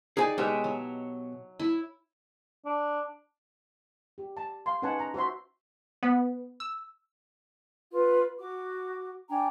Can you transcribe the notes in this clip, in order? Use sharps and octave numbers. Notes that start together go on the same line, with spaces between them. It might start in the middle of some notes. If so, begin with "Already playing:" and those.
D#4 G#4 D5 G5 G#5
B2 G#3 B3 G4 C#5 E5
F#3
E4 E5
D4
G4
A5
F5 C6
C#4 D#4 B4 F#5 G#5 A5
A#5
F#4 C5 E5 C6
B3
E6
F4 B4
F#4 D6
D4 G5 G#5 A#5